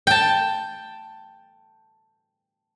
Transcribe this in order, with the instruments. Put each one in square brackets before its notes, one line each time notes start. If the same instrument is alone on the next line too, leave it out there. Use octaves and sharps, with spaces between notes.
[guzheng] G5 A5